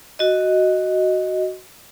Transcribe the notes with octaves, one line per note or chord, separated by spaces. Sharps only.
F#4 D#5